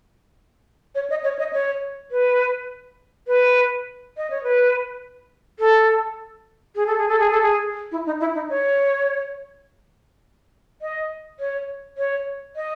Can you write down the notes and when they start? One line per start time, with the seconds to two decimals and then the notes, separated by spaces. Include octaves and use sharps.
0.95 C#5
1.10 D#5
1.24 C#5
1.39 D#5
1.53 C#5
2.11 B4
3.27 B4
4.17 D#5
4.30 C#5
4.43 B4
5.59 A4
6.76 G#4
6.87 A4
6.98 G#4
7.09 A4
7.19 G#4
7.31 A4
7.42 G#4
7.92 E4
8.06 D#4
8.21 E4
8.35 D#4
8.49 C#5
10.82 D#5
11.40 C#5
11.98 C#5
12.56 D#5